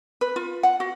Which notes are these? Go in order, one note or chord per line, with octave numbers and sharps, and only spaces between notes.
B4
F4
F#5
F#4